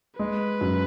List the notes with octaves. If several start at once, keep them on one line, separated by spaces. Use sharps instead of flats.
G#3 B4
F#2